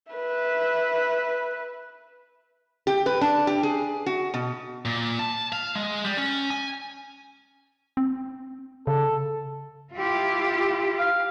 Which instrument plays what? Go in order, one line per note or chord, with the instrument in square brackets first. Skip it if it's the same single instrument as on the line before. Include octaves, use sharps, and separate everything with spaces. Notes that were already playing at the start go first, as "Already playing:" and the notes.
[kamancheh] B4 E5
[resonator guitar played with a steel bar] G4
B4
D4
G4
G#4
F#4
B2
[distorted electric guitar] A#2
A5
F5
G#3
G3
C#4
G#5
[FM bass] C4
[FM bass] C#3 [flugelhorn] A4
[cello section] E4 F4 G4
[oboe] F5